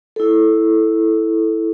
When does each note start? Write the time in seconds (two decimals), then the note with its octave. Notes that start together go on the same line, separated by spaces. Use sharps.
0.16 E4 A4